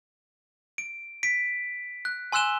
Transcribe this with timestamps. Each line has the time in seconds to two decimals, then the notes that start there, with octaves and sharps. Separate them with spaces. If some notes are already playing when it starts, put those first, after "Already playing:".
0.78 D7
1.23 B6 D7
2.05 F#6
2.32 G#5 C6 E6 F#6 E7 G7